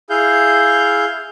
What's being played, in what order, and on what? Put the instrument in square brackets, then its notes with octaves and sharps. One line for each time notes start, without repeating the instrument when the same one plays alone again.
[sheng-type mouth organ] E4 G#4 F5 G6